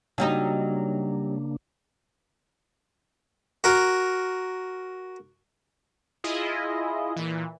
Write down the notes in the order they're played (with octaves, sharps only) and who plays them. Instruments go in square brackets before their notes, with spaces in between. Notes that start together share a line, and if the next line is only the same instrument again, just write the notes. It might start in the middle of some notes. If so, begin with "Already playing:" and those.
[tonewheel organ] C#3 A#3 D4 [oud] F#3 G3 D#4
[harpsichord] F#4 A#4
[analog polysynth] E4 F4 G#4 D#5
A#2 E3